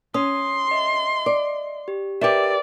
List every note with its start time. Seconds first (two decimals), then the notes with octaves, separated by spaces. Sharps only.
0.14 C#4 C6 D#6
0.71 D#5 E5
1.26 D5
1.88 G4
2.21 G4 A#4 B4 D5 E5